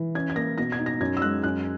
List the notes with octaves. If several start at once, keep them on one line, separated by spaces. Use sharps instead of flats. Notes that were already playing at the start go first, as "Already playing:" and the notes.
Already playing: E3
C#4 G#6
G#6
A#3 A#6
B2 A#6
G#6
D#4
A#6
F#2 G#6
E6
G#3 F#6
F#2 F#6